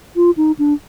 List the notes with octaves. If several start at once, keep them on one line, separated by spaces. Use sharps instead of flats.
F4
D#4
D4